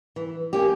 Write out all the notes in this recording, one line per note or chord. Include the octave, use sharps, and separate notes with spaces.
E3
A#3 C#4 G4